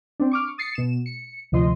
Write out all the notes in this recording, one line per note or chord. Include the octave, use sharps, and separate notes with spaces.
C4 D4
C#6 D6 F6
D#6 A6 C7 C#7
B2 E7
C#7
D2 C3 F3 D#5 C6